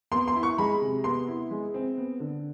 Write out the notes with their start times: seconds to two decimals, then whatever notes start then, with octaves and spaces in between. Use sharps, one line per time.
0.11 B3 C6
0.28 C6
0.35 E4
0.43 C#6
0.58 G#3 B5
0.81 C3
1.04 B3 C6
1.27 E4
1.51 G#3
1.74 C4
1.98 B3
2.20 D3